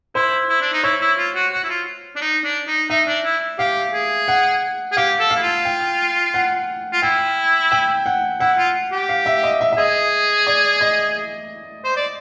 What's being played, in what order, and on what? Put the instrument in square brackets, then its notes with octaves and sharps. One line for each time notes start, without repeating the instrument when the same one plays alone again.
[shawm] E4 [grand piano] C5
[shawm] E4
D4
D#4
[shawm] E4 [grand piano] C#5
[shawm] E4
F4
F#4
F#4
E4
F4
D4
D#4
D4
D#4
[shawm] D#4 [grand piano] E5
[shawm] D4
E4
[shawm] G4 [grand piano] F5
[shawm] G#4
[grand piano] F#5
[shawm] G#4
[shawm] G4 [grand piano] F5
[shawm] A4
[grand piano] F5
[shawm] E4
F4
[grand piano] G5
F#5
[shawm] F4
[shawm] E4 [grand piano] G5
[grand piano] G5
F#5
[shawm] E4 [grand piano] F#5
[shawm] F4
G4
[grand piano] F5
E5
D#5
E5
E5
[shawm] G#4 [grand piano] D#5
[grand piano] D5
D#5
[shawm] C5
D5